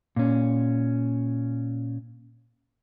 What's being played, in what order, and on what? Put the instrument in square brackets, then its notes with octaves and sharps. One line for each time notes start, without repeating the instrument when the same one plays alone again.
[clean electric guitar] A#2 C#4